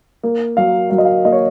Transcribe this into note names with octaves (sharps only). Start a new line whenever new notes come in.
A#3
F#3 F5
F#3 F5
D#5
F5
A#3 D#5
C#5